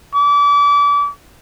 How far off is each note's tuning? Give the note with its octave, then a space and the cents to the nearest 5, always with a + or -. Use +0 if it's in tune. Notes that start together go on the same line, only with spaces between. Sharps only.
D6 -30